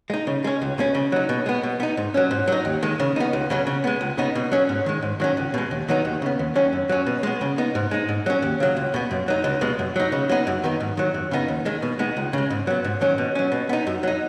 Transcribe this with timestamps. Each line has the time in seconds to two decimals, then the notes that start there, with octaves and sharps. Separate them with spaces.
0.10 G#3 D#4
0.27 C#3
0.44 G#3 C#4
0.62 C#2
0.78 B2 G#3 C#4
0.95 C#3
1.12 F#3 D#4
1.29 B2
1.46 G#3 B3
1.63 B2
1.80 B3 D#4
1.97 G#2
2.14 F#3 C#4
2.31 G#2
2.47 F#3 D#4
2.65 D#2
2.83 D#3 G#3
3.00 C#3
3.16 B3 D#4
3.33 C#2
3.50 C#3 F#3 C#4
3.67 C#3
3.84 G#3 B3
4.01 C#2
4.18 C#3 B3 D#4
4.35 B2
4.52 F#3 C#4
4.69 G#2
4.86 D#3 G#3
5.02 G#2
5.20 D#3 F#3 C#4
5.37 C#2
5.54 B2 G#3
5.71 D#2
5.88 D#3 F#3 B3 D#4
6.05 D#2
6.22 C#3 B3
6.39 D#2
6.56 D#3 F#3 C#4
6.73 F#2
6.89 F#3 C#4
7.06 B2
7.23 G#3 B3
7.41 C#3
7.58 B3 D#4
7.75 G#2
7.91 G#3 D#4
8.09 G#2
8.26 F#3 C#4
8.42 D#2
8.60 C#3 F#3
8.77 C#2
8.94 B2 B3
9.11 F#2
9.28 F#3 D#4
9.44 C#2
9.61 B2 G#3
9.79 F#2
9.96 F#3 D#4
10.12 C#3
10.29 F#3 B3 D#4
10.47 F#2
10.64 D#3 B3 D#4
10.80 G#2
10.97 D#3 F#3
11.14 F#2
11.31 C#3 B3 D#4
11.48 D#2
11.65 D#3 G#3
11.82 B2
11.99 G#3 B3 D#4
12.17 C#2
12.33 C#3 G#3
12.50 G#2
12.67 F#3 B3
12.84 G#2
13.01 D#3 F#3 C#4
13.18 B2
13.35 F#3 C#4
13.52 B2
13.69 B3 D#4
13.87 F#2
14.03 F#3 D#4